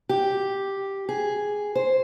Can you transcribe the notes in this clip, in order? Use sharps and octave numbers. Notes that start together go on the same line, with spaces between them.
G4
G#4
C5